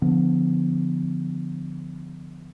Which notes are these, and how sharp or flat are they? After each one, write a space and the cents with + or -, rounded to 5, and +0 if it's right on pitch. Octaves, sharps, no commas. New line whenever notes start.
D3 +0 F3 +5 B3 +25